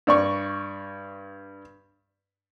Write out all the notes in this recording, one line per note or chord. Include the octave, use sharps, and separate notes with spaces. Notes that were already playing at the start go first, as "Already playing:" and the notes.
G2 D5 C#6